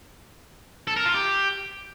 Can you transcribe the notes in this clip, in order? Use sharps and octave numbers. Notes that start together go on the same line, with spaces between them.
A4
A#4
F4
G4